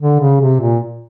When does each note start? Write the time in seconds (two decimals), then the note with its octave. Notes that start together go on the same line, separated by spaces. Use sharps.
0.01 D3
0.20 C#3
0.41 C3
0.60 A#2